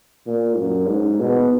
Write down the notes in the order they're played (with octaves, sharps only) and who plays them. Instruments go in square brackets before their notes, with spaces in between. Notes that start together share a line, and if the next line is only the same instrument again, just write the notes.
[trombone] A#2
F#2
G#2
B2